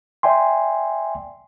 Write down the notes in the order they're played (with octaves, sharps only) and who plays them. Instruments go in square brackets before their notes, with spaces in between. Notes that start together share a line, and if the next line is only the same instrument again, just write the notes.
[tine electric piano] D5 E5 G5 G#5 C6